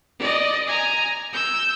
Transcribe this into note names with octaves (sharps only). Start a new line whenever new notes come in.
D5 D#5
G#5 A#5
E6 G6